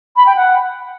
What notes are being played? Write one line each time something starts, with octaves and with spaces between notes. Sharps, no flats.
B5
G5
F#5